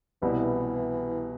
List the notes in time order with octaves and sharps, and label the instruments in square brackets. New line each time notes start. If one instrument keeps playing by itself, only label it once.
[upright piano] C2 B2 G3 B3 E4 [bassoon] E3